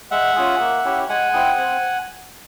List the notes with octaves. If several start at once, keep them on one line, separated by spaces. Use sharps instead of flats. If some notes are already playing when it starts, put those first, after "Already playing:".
G#3 E5 F#5
C#4 F4 G#4
A#3
C#4 E4 G4
G#3 F#5 G#5
C4 E4 G#4
C4